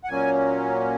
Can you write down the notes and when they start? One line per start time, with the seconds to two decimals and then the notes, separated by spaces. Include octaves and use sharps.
0.04 F#5
0.08 A#2 F#3 A#3 C#4 G#5